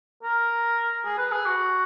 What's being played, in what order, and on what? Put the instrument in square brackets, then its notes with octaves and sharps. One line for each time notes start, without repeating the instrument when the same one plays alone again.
[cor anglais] A#4
G#4
B4
G#4
F#4